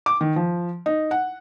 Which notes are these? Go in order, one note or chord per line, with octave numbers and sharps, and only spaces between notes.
D6
D#3
F3
D#4
F#5